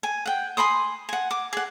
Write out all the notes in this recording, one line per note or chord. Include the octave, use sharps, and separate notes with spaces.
G#5
F#5 G5
G#5 B5 C6 D#6
F#5 G#5
D6
G#4 F#5